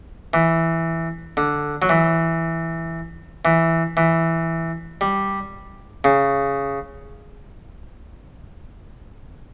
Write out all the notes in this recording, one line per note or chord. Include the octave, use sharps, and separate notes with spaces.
E3
D3
F#3
E3
E3
E3
G3
C#3